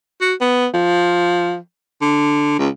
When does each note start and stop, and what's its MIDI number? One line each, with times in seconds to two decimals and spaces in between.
0.21 0.34 66
0.41 0.67 59
0.74 1.57 53
2.01 2.59 50
2.59 2.68 37